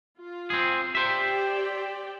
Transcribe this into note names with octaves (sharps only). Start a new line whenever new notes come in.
F4
C4 G#4
G4 C5 D5 E5 G5